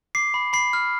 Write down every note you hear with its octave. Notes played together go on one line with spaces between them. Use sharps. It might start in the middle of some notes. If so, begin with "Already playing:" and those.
D6 C7
B5
B5 C7
F6